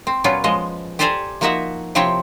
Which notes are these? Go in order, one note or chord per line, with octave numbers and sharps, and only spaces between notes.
C4
A#2 F#3 B3 C#4 F4
F3 G#3 D#5
G4 A4 C5 D5 G#5 A#5
F3 A#3 D#4 F#4 E5 F#5
C3 F3 C4 E4 C#5 G5